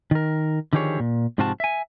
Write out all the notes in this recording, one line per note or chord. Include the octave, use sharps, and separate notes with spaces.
D#3 A#4
D3 D#3 F3 G4 G#4 C#5
A#2
G#2 C3 F3 C4 F#4 A5
E5 G#5